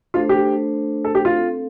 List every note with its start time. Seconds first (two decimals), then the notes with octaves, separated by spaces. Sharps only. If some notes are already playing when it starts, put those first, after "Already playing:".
0.14 A3 D4 F4 A4 C5
0.29 G4
1.05 A4
1.15 G4
1.25 F4
1.35 C4 A4 F5